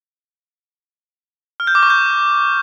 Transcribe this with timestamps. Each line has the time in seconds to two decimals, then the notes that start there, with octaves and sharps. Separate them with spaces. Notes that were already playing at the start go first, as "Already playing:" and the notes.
1.60 F6
1.67 G6
1.75 D6
1.83 C#6
1.90 G6